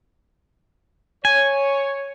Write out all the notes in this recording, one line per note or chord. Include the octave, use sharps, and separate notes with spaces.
C#5 G#5